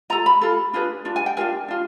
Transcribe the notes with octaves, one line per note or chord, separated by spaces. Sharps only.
F4 A4 A#5
B5
F4 A4
D4 F4 G#4 B4
D4 F4
G#5
G5
D4 F4 A#4 G#5
D4 F4